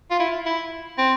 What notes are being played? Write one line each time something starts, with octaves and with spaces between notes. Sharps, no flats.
F4
E4
E4
C4